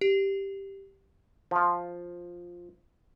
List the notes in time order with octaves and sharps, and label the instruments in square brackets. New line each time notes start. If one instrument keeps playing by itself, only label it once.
[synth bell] G4
[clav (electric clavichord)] F3 F4